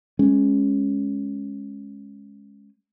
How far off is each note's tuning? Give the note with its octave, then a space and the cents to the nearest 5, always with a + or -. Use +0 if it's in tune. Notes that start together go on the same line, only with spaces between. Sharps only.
G#3 +0 C#4 -5